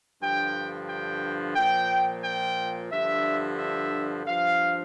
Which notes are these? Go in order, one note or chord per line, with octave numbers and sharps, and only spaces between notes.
G2 D3 F3 G5
G5
A#2 F3 G5
G5
G2 D3 F3 E5
E5
G2 F3 F5